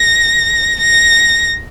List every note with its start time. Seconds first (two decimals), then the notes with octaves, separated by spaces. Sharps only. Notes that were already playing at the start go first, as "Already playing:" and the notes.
Already playing: A#6
0.80 A#6